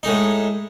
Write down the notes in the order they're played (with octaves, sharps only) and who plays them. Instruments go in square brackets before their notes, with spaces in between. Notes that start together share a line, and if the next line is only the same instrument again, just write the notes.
[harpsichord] A2 G#3 D#4